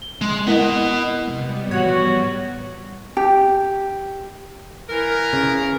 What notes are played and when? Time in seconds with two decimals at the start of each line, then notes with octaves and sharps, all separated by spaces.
0.02 G7
0.21 G#3
0.47 B3 E4 A#4 D#5 F#5
1.27 C3 G3 G#3 B3
1.71 A2 E3 F3 F#4 C#5
3.17 G4
4.89 E3 A#4
5.33 C#3